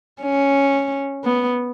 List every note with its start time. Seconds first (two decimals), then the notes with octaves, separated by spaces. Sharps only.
0.22 C#4
1.24 B3